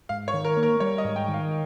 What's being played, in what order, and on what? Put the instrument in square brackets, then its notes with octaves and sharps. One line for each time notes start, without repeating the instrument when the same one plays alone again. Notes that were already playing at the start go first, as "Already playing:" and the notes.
[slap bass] G#2 [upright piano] F5
[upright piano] C#5
[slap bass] D#3
[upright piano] A#4
[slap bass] A#3
[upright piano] A#4
[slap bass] G3 [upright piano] C#5
[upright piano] D#5
[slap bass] G#2
[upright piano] G5
[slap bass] D#3
[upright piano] F5